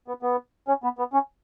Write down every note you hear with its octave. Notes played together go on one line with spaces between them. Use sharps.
B3
B3
C#4
B3
B3
C#4